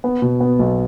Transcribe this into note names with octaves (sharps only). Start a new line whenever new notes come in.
B3
B2
B3
B1